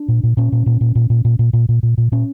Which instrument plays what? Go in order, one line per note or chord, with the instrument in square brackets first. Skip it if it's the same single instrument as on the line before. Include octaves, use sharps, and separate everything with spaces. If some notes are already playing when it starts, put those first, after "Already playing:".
Already playing: [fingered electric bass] D4
A#2
A#2
A#2 C#4
A#2
A#2
A#2
A#2
A#2
A#2
A#2
A#2
A#2
A#2
A#2
A#2 C#4